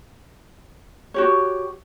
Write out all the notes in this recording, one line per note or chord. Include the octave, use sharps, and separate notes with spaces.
F#4 G4 C#5